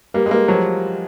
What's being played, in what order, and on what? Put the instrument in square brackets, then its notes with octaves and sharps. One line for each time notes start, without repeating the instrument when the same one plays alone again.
[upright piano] G3 [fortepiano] A#3
[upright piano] G#3
[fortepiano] A#3
[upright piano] F3 [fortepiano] F#3